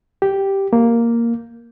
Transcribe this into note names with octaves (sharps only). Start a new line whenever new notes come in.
G4
A#3